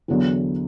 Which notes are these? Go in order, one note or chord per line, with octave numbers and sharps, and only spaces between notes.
E2 D3 F#3 B3